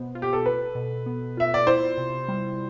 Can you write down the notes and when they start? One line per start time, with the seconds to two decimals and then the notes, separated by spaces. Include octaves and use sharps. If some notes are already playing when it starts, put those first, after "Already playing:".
Already playing: B2 B3 C5
0.15 F4
0.22 G4
0.33 A4
0.45 A4 B4
0.75 B2
1.06 B3
1.37 F4 E5
1.54 D5
1.67 E4 C5
1.98 C3
2.28 G3